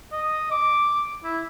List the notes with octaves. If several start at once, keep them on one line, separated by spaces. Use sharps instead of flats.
D#5
D6
E4